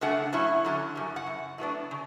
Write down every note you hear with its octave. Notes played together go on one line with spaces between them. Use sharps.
C#3 F#3 A3 D4 F#5
A2 F#3 C#4 E4
D3 F#3 C#4
F#2 C#3 G3
F#5
F#2 C#3
A2 F#3 B3 D4
C#3